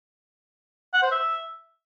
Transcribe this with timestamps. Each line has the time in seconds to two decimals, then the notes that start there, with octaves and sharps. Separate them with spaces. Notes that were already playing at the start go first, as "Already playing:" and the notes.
0.94 F#5
1.02 C5
1.11 E5